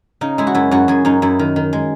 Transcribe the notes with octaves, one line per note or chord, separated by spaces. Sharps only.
C#3 D#4
G#3 E4
F#4
F#2 E4
F#2 F#4
F#2 G#4
F#2 D#4
F#2 E4
D#3
D#3
G#3